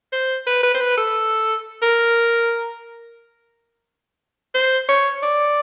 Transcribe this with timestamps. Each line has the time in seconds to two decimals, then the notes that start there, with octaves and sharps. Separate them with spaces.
0.13 C5
0.47 B4
0.63 B4
0.74 C5
0.81 B4
0.97 A4
1.82 A#4
4.55 C5
4.89 C#5
5.23 D5